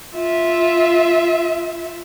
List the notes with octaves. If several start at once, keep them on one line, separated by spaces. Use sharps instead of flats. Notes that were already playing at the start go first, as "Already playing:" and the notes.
F4 E5